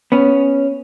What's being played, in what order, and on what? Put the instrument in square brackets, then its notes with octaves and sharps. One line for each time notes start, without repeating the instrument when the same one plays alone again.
[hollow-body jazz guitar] B3 C#4